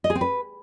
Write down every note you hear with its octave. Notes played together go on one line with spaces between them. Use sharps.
D#5
G#4
C4
B4